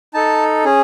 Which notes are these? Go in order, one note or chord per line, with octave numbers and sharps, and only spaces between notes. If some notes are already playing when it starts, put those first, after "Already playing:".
D#4 A4 A5
C#4 G#4